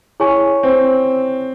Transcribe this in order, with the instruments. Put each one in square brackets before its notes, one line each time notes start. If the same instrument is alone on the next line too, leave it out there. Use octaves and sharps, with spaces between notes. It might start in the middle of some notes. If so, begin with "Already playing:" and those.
[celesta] E4 G#4 C#5 G#5 C#6
[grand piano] C4